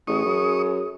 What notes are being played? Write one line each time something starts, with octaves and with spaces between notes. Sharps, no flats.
A1 G#4 C#6 D#6
F#2